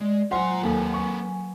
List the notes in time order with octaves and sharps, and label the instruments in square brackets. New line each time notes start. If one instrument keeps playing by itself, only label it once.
[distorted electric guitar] G#3 [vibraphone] D5
[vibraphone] F#3 G#5 [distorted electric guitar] F4 A#5 [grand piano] C5 F#5 C6
[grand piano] D#2 A4 [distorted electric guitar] A#3 B4
[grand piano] C#6